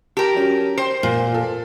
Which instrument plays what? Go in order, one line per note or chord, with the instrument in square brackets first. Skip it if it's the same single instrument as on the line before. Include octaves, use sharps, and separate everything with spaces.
[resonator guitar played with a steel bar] G4 A#4 [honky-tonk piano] A5 A#5
[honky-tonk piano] F#3 C#4
[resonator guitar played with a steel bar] C5 [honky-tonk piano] G5 C6
[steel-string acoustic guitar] A#2
[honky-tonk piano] F4 A4